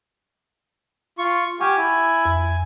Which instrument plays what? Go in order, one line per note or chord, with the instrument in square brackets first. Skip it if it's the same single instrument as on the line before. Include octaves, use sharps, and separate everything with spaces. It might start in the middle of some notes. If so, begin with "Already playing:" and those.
[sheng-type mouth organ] F4 C#6
[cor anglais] G4 [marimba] F#5 C#6 F6 [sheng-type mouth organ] G#5
[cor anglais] E4
[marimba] F2